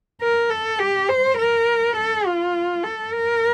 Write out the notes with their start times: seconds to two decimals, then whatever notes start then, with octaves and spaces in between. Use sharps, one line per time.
0.22 A#4
0.50 A4
0.79 G4
1.09 C5
1.38 A#4
1.97 A4
2.26 F4
2.84 A4
3.13 A#4